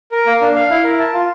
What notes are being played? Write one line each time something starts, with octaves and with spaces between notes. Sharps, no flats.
A#4
A#3
D4
F5
E4
A#4
A5
F4